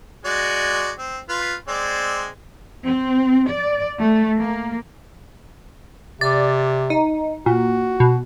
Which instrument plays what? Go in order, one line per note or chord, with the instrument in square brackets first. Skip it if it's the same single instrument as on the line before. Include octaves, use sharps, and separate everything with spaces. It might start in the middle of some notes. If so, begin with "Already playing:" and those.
[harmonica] G#3 F#4 D5
C4
F4 B4
G#3 C4 D5
[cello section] C4
D5
A3
A#3
[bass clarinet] C3 [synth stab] D5
[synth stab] D#4
[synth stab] A#2 [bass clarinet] F#4
[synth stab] B2